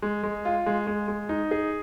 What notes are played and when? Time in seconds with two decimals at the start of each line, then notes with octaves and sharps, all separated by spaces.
0.02 G#3
0.23 G#3
0.45 F4
0.66 G#3
0.87 G#3
1.08 G#3
1.29 D#4
1.51 G#4